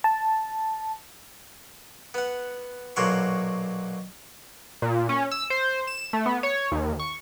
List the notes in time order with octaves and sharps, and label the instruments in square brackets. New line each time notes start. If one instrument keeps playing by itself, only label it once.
[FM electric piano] A5
[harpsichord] B3 F#5
B1 A#2 F#3 F#5 C6 C#6
[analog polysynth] A#2
C#4
E6
C5
E7
A3
B3
C#5
D#2
C#6